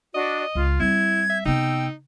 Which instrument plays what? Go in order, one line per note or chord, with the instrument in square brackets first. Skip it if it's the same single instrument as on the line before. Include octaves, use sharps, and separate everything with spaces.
[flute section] D4 F#4 D5 [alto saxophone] D#5
[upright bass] C#2 [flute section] F4
[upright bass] G3 C4 [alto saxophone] E4 [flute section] G#6
[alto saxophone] E5
[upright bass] C3 B3 [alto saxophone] D#4 [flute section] G5 E6